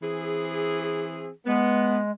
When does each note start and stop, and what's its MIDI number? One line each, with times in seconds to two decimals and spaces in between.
0.03 1.30 52
0.03 1.30 60
0.03 1.30 68
1.46 2.11 56
1.46 1.98 59